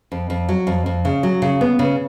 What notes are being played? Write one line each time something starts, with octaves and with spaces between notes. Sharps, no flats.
F2
F2
F#3
F2
F2
C#3
F#3
C#3
B3
C#3